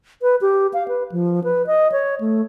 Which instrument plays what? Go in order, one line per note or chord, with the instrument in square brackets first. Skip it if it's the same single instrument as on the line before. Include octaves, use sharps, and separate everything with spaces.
[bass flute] B4
G4
F5
B4
F3
B4
D#5
C#5
A3